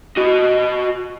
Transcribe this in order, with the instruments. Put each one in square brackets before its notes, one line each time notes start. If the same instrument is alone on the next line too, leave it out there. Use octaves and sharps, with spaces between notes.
[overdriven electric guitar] F#4 D#5